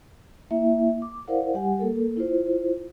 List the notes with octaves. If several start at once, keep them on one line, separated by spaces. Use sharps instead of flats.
A#3 E4 E5
D6
E4 A#4 C5 D5 F5 F#5
G3 G4 F#5 G#5
A#3 A4 A#4
E4 F4 C5